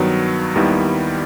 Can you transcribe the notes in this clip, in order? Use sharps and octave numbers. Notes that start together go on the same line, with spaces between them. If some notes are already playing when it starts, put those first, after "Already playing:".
Already playing: G2 D#3 F#3 B3
D#2 D#3 G3 B3 E4